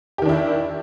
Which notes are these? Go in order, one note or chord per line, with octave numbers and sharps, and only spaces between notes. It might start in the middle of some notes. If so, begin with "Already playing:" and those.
D#3 D4 E4 G4